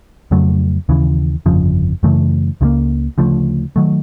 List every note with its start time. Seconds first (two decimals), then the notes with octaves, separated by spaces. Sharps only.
0.31 F2 C#3 F#3 A3
0.89 D#2 C#3 E3
1.46 G1 F2 C#3 F3
2.03 F#2 C#3 E3 A3
2.61 C#2 C#3 F3 A#3
3.18 D2 C#3 F3 A3
3.76 D#3 F#3 A3